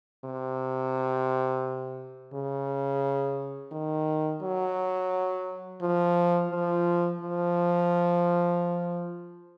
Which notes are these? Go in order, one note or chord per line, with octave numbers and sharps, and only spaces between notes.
C3
C#3
D#3
F#3
F3
F3
F3